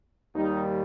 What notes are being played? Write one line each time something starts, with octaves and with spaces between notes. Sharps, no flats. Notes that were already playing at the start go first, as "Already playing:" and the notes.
D#2 D#3 G3 D#4